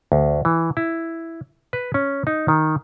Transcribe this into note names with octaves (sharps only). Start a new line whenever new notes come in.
D2
E3
E4
B4
C#4
D#4
D#3